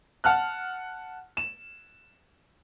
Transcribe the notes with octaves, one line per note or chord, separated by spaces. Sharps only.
F#5 A5 F6 F#6
E7